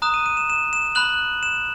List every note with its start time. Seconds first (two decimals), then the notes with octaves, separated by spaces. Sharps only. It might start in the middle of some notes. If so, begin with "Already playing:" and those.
0.02 A#5 D#6 F#6 E7
0.14 D#7
0.26 D#7
0.37 E7
0.50 E7
0.73 E7
0.95 B5 F#6 F#7
1.43 E7